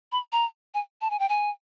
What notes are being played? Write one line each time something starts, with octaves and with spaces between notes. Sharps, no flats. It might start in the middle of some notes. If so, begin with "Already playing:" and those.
B5
A#5
G#5
A5
G#5
G5
G#5